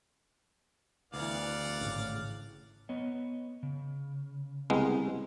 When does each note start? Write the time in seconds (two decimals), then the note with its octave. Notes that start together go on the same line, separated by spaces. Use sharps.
1.14 D2 E3 B3 D5 F5 F#5
1.79 G#1 A2 C#3
2.89 B3 C#5 D#5
3.63 C#3
4.70 C2 G#3 B3